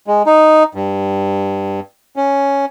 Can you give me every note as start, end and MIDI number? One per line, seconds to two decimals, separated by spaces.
0.07 0.22 56
0.26 0.63 63
0.75 1.80 43
2.16 2.65 61